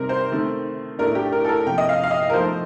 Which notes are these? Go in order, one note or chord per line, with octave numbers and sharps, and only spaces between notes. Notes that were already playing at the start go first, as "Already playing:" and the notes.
Already playing: C3 G3 C4 D#4 A#4
C5
D#3 A3 C4
A2 A3 D4 A#4
G4
A#4
A4
A#4
C3 F3 A#3 G5
D#5
F5
F5
D#5
A#4
F3 A3 D#4 C5